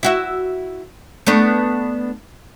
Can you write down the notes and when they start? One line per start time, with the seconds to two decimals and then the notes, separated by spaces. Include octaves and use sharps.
0.03 E4 F#4 E5
1.27 A3 B3 D4